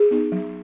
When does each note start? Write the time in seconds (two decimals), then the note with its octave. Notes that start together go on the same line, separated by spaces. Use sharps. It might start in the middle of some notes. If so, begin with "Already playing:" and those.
Already playing: G#4
0.11 B3 D#4
0.32 F#3